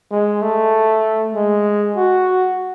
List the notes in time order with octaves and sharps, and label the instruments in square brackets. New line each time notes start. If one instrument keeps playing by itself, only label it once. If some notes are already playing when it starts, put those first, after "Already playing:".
[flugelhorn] G#3
A3
G#3
F#4